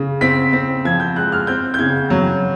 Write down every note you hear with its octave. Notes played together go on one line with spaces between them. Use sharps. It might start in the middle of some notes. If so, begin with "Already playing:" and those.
Already playing: C#3
C4 B6
C4
F3 G#6
G6
G#3 F#6
F6
C4 G6
G6
C#3 G#6
F#3